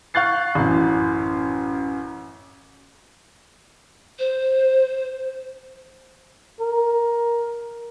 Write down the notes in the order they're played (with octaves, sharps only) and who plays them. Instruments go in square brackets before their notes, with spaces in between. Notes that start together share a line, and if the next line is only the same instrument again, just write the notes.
[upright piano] F5 C#6 F#6 G6 A6 C7
A1 F#2
[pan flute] C5
[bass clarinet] A#4